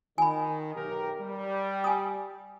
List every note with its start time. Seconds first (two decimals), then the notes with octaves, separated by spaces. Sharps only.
0.18 D#3 G#5 B5
0.75 B1 G4 A#4
1.20 G3
1.84 G#5 D#6